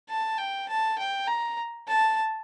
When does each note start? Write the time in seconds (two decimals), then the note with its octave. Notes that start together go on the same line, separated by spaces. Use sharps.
0.09 A5
0.38 G5
0.69 A5
0.99 G5
1.28 A#5
1.88 A5